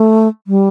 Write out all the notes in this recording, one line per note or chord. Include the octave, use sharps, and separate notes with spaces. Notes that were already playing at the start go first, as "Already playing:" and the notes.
Already playing: A3
G3